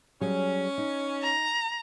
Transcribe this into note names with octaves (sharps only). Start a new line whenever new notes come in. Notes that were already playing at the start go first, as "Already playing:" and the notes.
F#3 G3 C#4 G#4
D#4
A#5